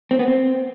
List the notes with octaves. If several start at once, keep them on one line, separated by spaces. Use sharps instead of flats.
C4
B3
C4